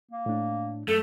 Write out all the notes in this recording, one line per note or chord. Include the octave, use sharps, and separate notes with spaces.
A#3
A2 D4
F#2 A3 A4